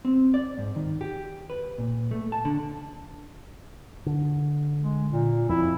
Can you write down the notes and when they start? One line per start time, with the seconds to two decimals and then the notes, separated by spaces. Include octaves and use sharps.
0.05 C4
0.34 D5
0.58 G#2
0.76 D#3
1.01 G4
1.50 B4
1.78 A#2
2.11 A3
2.32 A5
2.45 D3
4.06 D3
4.81 G#3
5.12 A#2
5.49 F2 E4